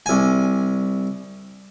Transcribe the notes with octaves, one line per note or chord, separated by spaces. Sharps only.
C2 G#5